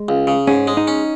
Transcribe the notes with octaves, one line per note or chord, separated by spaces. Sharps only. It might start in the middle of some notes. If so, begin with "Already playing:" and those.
Already playing: G#3
C#2
C#3
G#2 C#4
G#3
D#4
C#4